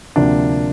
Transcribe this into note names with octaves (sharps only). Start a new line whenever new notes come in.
D2 C3 F3 A#3 D4